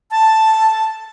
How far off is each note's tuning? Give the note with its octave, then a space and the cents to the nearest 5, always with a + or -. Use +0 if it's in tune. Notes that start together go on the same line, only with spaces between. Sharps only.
A5 +0